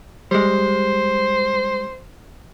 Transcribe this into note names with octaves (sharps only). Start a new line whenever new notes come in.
G3 G#3 C5